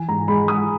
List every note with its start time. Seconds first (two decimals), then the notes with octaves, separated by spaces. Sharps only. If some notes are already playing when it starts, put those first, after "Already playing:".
Already playing: E3 G#5
0.08 G#2 A#5
0.28 G#3 B5
0.48 G#3 D#6